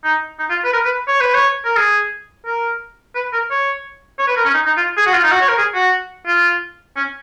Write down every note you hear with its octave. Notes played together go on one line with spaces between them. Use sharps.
D#4
D#4
F4
B4
A#4
B4
C#5
B4
C#5
A#4
G#4
A#4
B4
A#4
C#5
C#5
B4
A#4
C#4
D#4
D#4
F4
G#4
F#4
F4
D#4
F#4
C#5
A#4
G#4
F#4
F4
C#4